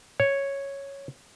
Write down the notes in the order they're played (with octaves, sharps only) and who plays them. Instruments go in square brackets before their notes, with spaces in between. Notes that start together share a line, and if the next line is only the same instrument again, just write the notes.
[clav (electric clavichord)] C#5